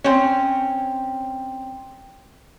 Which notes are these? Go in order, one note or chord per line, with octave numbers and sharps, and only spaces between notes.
C4 C#4